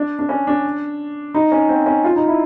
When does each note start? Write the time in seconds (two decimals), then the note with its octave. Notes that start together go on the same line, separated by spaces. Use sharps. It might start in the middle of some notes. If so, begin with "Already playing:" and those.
Already playing: D4
0.19 D4
0.29 C#4
0.47 D4
1.34 D#4
1.52 C#4
1.69 C4
1.86 C#4
2.04 F4
2.16 D#4
2.27 E4